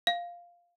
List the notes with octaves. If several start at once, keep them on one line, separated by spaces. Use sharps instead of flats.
F5